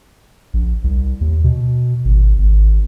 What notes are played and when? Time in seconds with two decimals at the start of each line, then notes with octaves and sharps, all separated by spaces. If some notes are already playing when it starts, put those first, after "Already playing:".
0.54 A#1
0.84 C2
1.21 D#2
1.44 B2
2.05 G#1
2.39 G#1